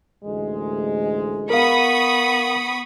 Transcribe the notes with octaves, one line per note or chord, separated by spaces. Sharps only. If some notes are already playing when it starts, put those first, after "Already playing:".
A1 D2 G#3
B3 A#4 F5 B5 C#6 D#6